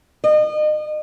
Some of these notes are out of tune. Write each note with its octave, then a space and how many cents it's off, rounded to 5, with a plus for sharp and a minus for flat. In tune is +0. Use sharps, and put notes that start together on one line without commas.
D#5 -35